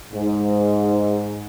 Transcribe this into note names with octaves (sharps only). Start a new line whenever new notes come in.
G#2